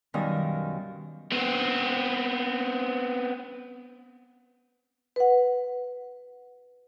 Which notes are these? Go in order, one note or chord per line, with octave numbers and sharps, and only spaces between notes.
F#2 B2 D#3 G3 F5 D#6
B3 C4
B4 F#5